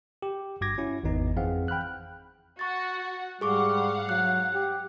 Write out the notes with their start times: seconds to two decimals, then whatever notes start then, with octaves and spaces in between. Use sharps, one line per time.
0.22 G4
0.61 G1 G2 F#4 D6 G#6 A#6
0.78 C#4 E4 F#4
1.03 G#1 E2 B3 D#4
1.36 F2 E3 C4 G#4 F5 F#5
1.68 G5 B5 F6 F#6
2.59 F#4 F#5 C#6 A6
3.41 G#2 G3 G#4 F5 F#5 C#6 D6
4.09 F#3 F#6
4.53 G4